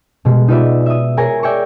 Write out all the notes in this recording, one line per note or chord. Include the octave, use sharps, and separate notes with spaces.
B2 G3 G#3
D#4 F4 F#4 B4 D5 E5
E5 D#6
G#4 A#4 C#5 G#5 A#5 C#6
D5 E5 G5 G#5 A#5 C#6